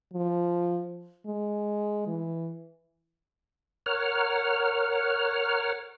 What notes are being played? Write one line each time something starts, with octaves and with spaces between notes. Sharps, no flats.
F3
G#3
E3
A#4 C#5 F#5 F6